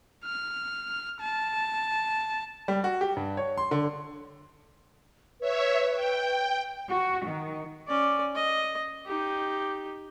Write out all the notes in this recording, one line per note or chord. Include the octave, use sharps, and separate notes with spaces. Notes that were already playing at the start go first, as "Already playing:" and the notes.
F6
A5
G3
F#4
G4
G2
C#5
C6
D3
B4 C#5 E5
G5
F#4
D#3
C#4 D5
D#5
D#4 G4